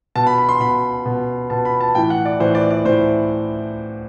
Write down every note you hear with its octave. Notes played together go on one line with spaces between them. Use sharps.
B2 A5
B5
B5
C6
B2 B5
B2
B2 A5
B5
A5
A2 E3 G5
F#5
D5
A2 E3 C5
D5
D5
A2 E3 C5